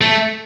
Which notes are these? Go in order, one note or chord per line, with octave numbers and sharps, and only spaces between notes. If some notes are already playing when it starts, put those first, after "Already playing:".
A3